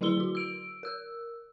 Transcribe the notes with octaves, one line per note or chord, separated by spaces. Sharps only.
D3 F#3 E4 G#4 C6 G7
D3 F#4
E6 D7
A#4 E6